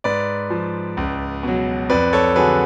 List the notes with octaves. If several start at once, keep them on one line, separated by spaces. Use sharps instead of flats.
G#2 B4 D5
F3
C#2
B2 F#3
F2 B4 D5
A4 C#5
D3 F#3 G#4 B4